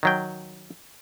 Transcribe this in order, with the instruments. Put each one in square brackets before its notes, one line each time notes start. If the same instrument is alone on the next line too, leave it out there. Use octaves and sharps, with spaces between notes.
[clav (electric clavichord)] D#3 F#3 G5